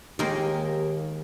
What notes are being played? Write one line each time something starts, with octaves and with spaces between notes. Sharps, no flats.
D#2 D#3 G#3 A#3 G4